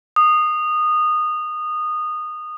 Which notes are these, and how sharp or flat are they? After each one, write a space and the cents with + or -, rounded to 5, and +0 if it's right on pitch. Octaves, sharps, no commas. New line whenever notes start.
D#6 -20